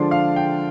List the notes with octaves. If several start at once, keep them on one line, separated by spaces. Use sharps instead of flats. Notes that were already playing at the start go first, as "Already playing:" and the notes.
Already playing: D3 F3 G#3 D4 C6
F5
G5